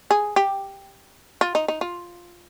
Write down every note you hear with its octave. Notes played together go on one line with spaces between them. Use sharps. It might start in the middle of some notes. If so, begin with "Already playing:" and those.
G#4
G4
F4
D#4
D#4
F4